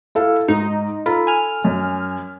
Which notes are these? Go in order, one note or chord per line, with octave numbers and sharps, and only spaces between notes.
E4 A4 F5
G#2 D#4
F4 A4 A#5 B5
G#5 F6
F#2